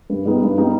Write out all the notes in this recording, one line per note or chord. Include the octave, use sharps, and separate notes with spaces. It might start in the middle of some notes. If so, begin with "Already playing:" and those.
G2
G3 B3 D#4
G2
G3 B3 D#4